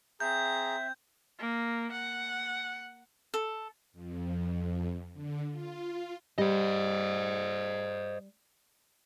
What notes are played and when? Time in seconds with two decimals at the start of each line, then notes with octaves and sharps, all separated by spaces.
0.20 C4 G#4 E5 A#5 G6
1.39 A#3
1.92 F#5
3.34 A4
3.93 F2
5.13 D3
5.51 F4
6.38 G3 C5 D#5